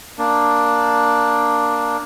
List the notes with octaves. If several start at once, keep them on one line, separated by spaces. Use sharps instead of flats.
A#3 D4